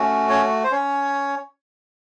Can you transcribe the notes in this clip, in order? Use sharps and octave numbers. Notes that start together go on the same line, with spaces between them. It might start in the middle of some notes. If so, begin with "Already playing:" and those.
Already playing: A3 C#4 F#4
C#4 C#5
C5
C#4 C#5